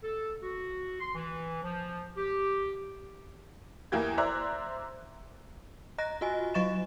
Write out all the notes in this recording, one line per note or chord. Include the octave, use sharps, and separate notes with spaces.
A4
F#4
C6
E3
F3
G4
E2 A#3 E4 G4 G#6
C5 D5 E5 A#5 F#6
D#5 A#5 F#6 A#6
F4 F#4 D#5 G#5
F#3 D#5 C#6 A6 E7